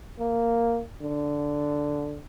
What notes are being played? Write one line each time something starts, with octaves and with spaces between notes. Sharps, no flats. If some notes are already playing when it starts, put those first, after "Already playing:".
A#3
D3